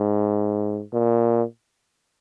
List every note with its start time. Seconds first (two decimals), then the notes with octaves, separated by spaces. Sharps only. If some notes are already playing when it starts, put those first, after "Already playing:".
Already playing: G#2
0.93 A#2